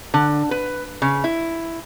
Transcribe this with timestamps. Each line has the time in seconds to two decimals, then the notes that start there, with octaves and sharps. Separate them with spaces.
0.14 D3
0.51 B4
1.02 C#3
1.24 E4